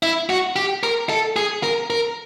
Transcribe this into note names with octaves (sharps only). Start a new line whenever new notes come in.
E4
F#4
G4
A#4
A4
G#4
A#4
A#4